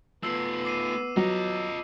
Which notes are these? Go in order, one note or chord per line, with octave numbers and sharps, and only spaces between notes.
A3 B3 F4 E6 C7
D6 C7 D#7
F#3 F4 D#5